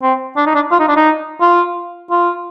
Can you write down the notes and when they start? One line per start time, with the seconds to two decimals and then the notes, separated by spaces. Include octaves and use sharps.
0.03 C4
0.37 D4
0.46 D#4
0.55 D4
0.72 F4
0.80 D#4
0.88 D4
0.96 D#4
1.41 F4
2.11 F4